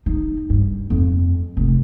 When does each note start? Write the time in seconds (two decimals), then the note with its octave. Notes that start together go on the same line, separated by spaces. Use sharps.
0.06 D#4
0.50 G2
0.90 F2
1.57 F1